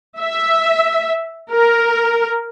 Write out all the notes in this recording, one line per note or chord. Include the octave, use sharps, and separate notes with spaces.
E5
A#4